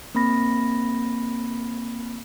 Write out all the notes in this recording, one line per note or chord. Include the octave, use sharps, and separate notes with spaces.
A#3 C4 B5 A#6